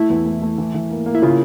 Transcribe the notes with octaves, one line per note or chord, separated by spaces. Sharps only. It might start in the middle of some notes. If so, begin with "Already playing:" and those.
Already playing: A3 E4
E2
A3
A3
E3
E3
A#3
A#3
E4
C#3 F4